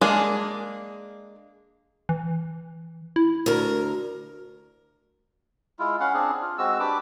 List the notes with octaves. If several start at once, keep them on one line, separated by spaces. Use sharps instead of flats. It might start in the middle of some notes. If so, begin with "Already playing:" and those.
G#3 A#3 D4 G#4
E3
E4
D2 A#4
G#3 E4 F4
C#4 F5 F#5
C4 D4 G#4
F4
G#3 C4 F#4 E6
D4 G4 B4 D6